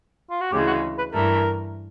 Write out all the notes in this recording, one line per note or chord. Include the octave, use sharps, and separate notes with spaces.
F4
F#4
D2 C#3 E3 G#3 G4
F#4
B4
G2 E3 A3 A#4